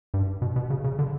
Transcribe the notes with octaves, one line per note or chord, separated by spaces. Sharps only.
G2
B2
B2
C#3
C#3
D3